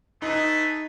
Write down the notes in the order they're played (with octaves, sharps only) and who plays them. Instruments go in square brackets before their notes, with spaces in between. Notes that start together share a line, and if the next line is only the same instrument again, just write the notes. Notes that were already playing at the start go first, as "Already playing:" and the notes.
[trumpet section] A3 G#4 B4 [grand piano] D#4